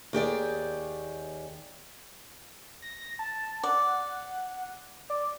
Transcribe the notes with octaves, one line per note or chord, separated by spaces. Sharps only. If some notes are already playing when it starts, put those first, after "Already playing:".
D#2 G4 G#4 D5
A#6
A5
D5 F#5
D5